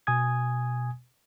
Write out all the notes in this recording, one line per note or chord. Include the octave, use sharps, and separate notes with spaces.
B2 G#5 D#6 G#6